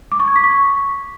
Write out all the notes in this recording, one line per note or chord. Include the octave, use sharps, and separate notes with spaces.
D6
C#6
G#6
B6
C#6